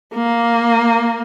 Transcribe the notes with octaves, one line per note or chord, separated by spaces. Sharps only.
A#3